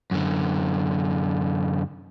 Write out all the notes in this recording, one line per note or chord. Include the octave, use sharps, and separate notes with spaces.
F#2 D3